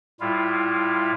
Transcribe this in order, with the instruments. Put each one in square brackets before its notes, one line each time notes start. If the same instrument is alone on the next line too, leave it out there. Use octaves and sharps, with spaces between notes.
[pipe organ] A2 G3 E4 F4